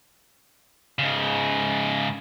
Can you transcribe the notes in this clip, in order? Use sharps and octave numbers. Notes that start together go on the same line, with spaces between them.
G#2 C#3